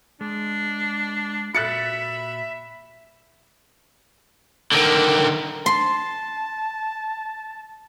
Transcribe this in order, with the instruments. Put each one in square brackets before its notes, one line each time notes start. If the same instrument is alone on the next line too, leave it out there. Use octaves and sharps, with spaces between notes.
[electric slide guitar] G#3 [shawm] D4
[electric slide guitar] A#2 F#4 [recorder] E5 [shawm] B5 [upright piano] F#6 A6 C#7
[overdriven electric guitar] D3 D#3
[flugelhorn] A5 [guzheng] C6